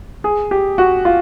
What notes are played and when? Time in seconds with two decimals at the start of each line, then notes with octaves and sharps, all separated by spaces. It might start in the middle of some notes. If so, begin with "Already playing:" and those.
0.24 G#4
0.51 G4
0.78 F#4
1.05 F4